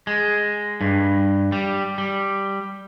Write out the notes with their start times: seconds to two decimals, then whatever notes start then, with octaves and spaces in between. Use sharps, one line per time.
0.07 G#3
0.81 G2
1.52 G3
1.98 G3